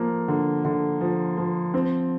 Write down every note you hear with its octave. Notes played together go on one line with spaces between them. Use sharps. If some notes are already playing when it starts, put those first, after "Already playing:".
Already playing: F3 A#3
D3
D3
F3
F3
C4